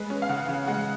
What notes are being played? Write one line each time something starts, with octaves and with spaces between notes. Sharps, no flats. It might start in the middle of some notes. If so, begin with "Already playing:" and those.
Already playing: G#3 B4
C#4
F5
C#3 F#5
C#3
G#3 F#5